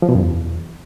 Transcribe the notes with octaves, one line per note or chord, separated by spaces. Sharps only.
F3
B2
F#2
E2